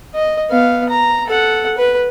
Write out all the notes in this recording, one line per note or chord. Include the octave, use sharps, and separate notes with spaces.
D#5
B3 F5
A#5
A4 F#5
B4